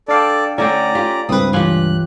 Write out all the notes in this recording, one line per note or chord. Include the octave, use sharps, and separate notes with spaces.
D4 A4 D5 F5 G5
D3 A3 C#4 E4 A4 D5 G5 A#5
F4 G4
C#2 G2 C4 B4 D#6
E3 F4 G4 C#5 G#5 F#6